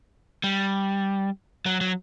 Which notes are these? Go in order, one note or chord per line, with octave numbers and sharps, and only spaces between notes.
G3
F#3
F#3